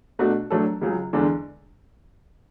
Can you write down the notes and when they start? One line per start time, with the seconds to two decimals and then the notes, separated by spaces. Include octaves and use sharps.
0.19 B2 A3 D4 F#4
0.50 A2 F#3 A3 D4 A4
0.81 C#2 C#3 F#3
1.13 E2 D3 G#3 D4